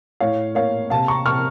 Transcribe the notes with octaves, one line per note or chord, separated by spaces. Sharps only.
A2 C#5 F5
A#3 C#5 F5
C3 F5 A5
A#5 C#6
C3 C#6 F6